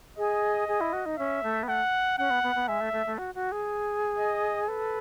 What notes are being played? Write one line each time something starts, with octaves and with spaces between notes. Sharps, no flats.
G#4 D#5
G#4
E4
F#4
D#4
C#4 E5
A3
B3
A3 F#5
C#4 F#5
B3
B3
B3
G#3 E5
A3
A3
A3
F#4
F#4
G#4
D#5
A4 B4